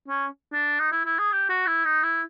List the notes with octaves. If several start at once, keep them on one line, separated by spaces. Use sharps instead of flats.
C#4
D4
D#4
E4
E4
G#4
G4
F#4
E4
D#4
E4